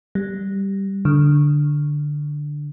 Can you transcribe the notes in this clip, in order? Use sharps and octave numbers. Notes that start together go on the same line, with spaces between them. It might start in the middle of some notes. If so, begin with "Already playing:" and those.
G3
D3